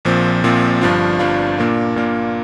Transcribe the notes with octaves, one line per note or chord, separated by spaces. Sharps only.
A#1 A#2 F3 C4
A#1 A#2 F3 C4
G1 G2 F3 D4 F4
G1 G2 F3 D4 F4
A#2 A#3 D4 F4
A#2 A#3 D4 F4